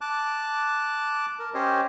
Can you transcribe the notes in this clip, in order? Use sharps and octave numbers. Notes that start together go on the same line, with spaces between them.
A5 D6 F#6
A#4
C#4 G4 C5 C#5 D#5